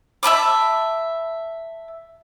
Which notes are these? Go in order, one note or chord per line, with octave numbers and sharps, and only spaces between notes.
E5 A5 B5 D6